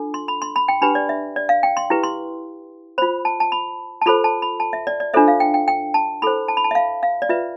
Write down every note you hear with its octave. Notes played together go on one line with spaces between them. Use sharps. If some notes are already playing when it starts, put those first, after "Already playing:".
Already playing: D4 F4 A4
C6
B5
C6
B5
G5
D4 G4 B4 B5
D5
E5
D5
F5
G5
C6
E4 G4 B4
C6
F4 C5 B5
A5
A5
B5
A5
F4 A4 C5 B5
A5
B5
A5
E5
D5
D5
D4 F4 A4 C5 E5
F5
G5
G5
G5
A5
E4 A4 C5 B5
A5
B5
A5
E5
F5
F5
D5
F4 B4 E5